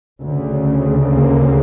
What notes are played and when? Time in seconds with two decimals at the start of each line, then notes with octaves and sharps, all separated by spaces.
0.22 D2 C#3
1.06 A#3